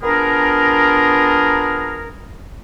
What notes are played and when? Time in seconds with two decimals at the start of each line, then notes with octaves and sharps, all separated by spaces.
0.03 B3 D4 F4 G#4 A#4